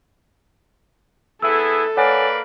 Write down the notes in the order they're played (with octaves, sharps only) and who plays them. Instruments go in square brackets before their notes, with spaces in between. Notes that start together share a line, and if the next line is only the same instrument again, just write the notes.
[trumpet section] B3 E4 G#4 [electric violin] A4 [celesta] E6
[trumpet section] A#3 B4 D5 [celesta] C#5 F#5 G#5